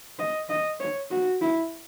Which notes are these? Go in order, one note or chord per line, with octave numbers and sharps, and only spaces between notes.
D#5
D#5
C#5
F#4
E4